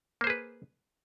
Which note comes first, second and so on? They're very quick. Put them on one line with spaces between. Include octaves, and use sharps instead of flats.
A#3 C5 G#4 B4